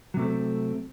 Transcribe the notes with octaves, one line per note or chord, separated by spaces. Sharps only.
C3 F#3 A3 C4